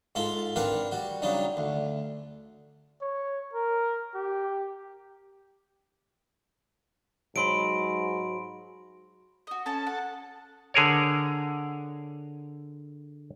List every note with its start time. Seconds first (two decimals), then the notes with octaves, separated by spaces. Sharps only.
0.15 G#2 F4 A4 C6
0.56 C4 D4 A#4 B4 F5 F#5
0.91 G3 F#4
1.22 C#3 F#3 G3 D4 D#4
1.57 D2
3.02 C#5
3.53 A#4
4.15 G4
7.36 G#2 F#3 B5 C6 D7
9.47 F#4 D#5
9.66 C#4 A4 A5
9.86 F#5
10.74 D3 G#4 A#4 C#5